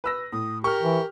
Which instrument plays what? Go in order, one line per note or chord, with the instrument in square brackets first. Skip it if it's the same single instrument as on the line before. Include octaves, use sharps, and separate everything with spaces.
[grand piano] B4 E6 A#6
[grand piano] A2 [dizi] D#6
[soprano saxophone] G4 [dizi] A#4 [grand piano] C#6 F6
[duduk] E3